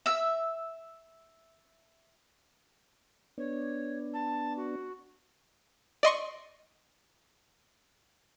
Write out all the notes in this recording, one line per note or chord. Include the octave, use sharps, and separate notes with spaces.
E5 E6
B3 D4 C#5
A5
F#4
D5 D#5 C6 C#6